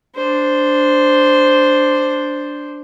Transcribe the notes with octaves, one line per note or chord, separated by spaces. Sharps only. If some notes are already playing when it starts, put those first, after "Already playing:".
D4 C5